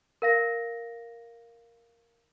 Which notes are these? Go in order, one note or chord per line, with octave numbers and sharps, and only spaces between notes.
A#4 F5 A#6